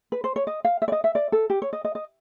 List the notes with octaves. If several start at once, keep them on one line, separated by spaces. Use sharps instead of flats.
B4
C5
C#5
D#5
F5
E5
D5
D#5
E5
D5
A4
G4
C#5
D#5
D#5
D#5